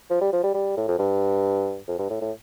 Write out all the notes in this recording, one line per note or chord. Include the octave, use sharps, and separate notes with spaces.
F3
G3
F3
G3
G3
A2
F2
G2
F2
G2
A2
A2